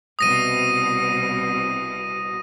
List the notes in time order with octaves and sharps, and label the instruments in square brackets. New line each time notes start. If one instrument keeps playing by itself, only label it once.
[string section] C2 B2 [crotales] D#6 A#6 D#7